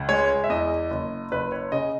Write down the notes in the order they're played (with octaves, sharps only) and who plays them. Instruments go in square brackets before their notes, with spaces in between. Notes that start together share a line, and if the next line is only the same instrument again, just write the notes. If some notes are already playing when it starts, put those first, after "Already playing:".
Already playing: [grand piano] C#2
G#3 C#5
E5
E2 D#5
F#1
F#1 B4
C#5
C#3 D#5